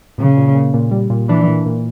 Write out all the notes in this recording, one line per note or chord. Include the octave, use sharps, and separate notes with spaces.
A#2 C#3
A#2
A#2
A#2
G3
A#2
E3 D4
A#2
A#2